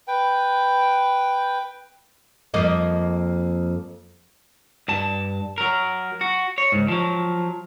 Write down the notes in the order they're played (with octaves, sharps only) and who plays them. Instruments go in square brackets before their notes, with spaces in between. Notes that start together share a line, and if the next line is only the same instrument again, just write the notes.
[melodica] B4 G5
[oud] F2 A#3 D#5
[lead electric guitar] G2 A5
F#3 A#4
F#4
C#5
C#2 G#2
F3 F#3